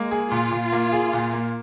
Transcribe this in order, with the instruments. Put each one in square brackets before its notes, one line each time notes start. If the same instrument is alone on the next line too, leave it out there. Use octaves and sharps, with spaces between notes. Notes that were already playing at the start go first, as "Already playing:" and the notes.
Already playing: [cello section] G#3 [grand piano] A#3
[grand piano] G#4
[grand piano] A#2 [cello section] F4
[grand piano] A#2
A#3
G#4
A#2
A#3